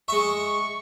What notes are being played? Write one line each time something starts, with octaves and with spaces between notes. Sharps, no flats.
G#3 E5 C#6